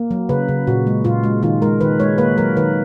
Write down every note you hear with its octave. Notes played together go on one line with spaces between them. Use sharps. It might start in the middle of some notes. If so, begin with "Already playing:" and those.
Already playing: A#3
F#3
C#3 B4
C#3
A#2 F#4
G#3
A#2 F4
G#3
D#3 F4
G#3 A#4
D#3 B4
G#3 C#5
A#3 B4
F#3 A#4
D#3 B4